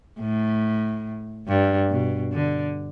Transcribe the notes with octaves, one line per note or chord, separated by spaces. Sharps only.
A2
G2
B2
D3